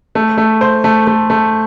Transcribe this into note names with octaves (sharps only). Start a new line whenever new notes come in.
A3
A3
C5
A3
A3
A3